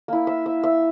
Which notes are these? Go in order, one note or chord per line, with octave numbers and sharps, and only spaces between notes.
A#3 E4
E5
E5
E5